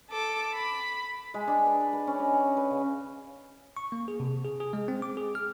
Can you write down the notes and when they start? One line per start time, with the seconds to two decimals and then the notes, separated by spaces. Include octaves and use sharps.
0.11 A4 D6
0.54 B5
1.34 G#3
1.48 D4
1.66 B4
1.80 B4
1.93 B4
2.07 C#4
2.19 D#5
2.33 C#4
2.57 B4
2.71 C#3
3.77 C#6
3.92 A#3
4.08 G#4
4.20 C3
4.45 G#4
4.60 G#4
4.73 G#3
4.88 C4
5.02 D6
5.17 G#4
5.35 F6